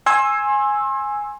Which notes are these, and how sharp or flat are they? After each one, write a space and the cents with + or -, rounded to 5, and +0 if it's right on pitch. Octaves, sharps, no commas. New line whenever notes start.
G#5 +0 C6 +35 E6 +0